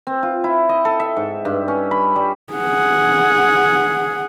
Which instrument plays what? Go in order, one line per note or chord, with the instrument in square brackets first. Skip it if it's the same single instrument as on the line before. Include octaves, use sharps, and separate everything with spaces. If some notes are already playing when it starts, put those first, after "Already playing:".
[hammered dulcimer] C4
F4
E4
D#5
A4
E5
G#2
G2
C#4
B5
G3
[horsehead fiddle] G#4 F#5